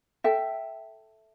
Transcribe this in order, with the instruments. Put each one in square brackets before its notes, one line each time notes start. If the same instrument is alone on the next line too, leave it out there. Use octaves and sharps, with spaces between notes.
[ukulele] A4 E5 G5